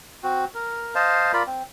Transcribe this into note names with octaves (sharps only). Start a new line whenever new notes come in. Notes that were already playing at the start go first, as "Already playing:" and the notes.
C4 F#4
A#4
C5 D#5 F5 A5
F4 A#4 D5 B5
C4